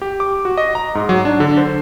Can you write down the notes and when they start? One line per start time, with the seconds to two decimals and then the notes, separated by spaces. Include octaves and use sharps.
0.02 G4
0.20 D6
0.45 F#4
0.57 D#5
0.75 A#5
0.95 G#2
1.09 F#3
1.25 D4
1.40 D3
1.57 C5